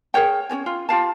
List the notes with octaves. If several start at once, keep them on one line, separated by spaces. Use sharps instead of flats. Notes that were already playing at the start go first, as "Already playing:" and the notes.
G#4 A#4 C#5 G5
C#4 F#4 C#5 G#5
F4
F4 G4 F5 A5